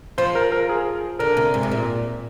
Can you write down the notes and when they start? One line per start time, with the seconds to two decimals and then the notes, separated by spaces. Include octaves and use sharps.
0.18 F3 C5
0.35 A#4
0.52 A#4
0.69 G#4
1.19 D3 A#4
1.37 C3
1.54 G#2
1.63 C3
1.71 A#2